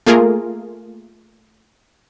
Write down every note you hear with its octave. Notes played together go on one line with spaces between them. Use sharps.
A3 A#3 F4 G#4 A#4